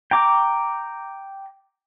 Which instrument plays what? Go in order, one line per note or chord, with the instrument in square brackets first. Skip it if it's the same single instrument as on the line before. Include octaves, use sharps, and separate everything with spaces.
[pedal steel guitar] G5 A#5 D6